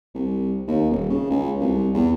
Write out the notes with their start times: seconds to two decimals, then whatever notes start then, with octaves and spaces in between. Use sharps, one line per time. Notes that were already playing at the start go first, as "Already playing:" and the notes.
0.15 C2
0.67 D#2
0.91 D#1
1.10 C#3
1.30 C#2
1.60 C2
1.94 E2